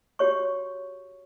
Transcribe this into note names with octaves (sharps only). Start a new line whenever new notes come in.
F#4 G4 C#5 C#6